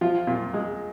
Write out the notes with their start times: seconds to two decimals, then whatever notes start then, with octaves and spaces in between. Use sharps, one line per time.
0.01 F3 F4
0.27 A#2
0.54 G#3